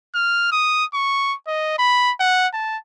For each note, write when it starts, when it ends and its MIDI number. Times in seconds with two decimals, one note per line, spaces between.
0.14 0.47 89
0.51 0.85 87
0.94 1.34 85
1.47 1.74 75
1.78 2.12 83
2.20 2.47 78
2.54 2.77 81